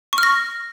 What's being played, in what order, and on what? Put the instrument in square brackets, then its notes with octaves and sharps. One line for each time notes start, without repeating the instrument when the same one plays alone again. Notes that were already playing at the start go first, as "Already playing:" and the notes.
[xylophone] C#6
F6
A#6